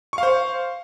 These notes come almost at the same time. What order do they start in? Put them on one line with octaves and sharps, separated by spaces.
C#6 F5 C5